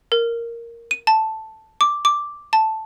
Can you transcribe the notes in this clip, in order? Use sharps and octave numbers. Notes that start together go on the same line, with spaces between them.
A#4
D#7
A5
D6
D6
A5